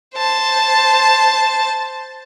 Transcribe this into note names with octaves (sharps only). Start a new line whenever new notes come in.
C5 A5